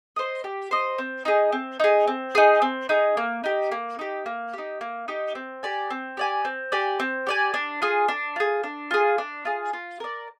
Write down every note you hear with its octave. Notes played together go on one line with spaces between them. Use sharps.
C5 D#5
G4
C5 D#5
C4
D#4 G#4
C4
D#4 G#4
C4
D#4 G#4
C4
D#4 G#4
A#3
D#4 G4
A#3
D#4 G4
A#3
D#4 G4
A#3
D#4 G4
C4
G4 D5 G#5
C4
G4 D5 G#5
C4
G4 D5 G#5
C4
G4 D5 G#5
D4
F4 G#4
D4
F4 G#4
D4
F4 G#4
D4
F4 G#4
F4
A#4 D5